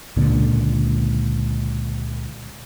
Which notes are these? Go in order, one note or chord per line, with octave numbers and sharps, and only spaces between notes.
C#2 A#2 D3